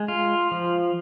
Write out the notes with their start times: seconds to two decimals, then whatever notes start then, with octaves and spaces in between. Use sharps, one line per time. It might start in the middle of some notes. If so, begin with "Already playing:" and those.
Already playing: G#3
0.08 F4
0.51 F3